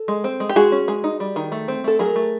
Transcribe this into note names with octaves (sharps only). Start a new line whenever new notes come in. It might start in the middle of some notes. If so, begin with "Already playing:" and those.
Already playing: A4
G#3
C4
G#3
G4
G#3 F#4 G#4
C#4
G#3
D#4
G3
D#3
A3
C4
A3 A4
F#3 G#4 A#4
A3